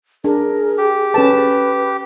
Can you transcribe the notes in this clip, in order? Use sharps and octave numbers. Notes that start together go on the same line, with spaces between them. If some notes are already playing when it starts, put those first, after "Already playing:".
D4 G#4 A#4
G4
C#4 A4 B4 A5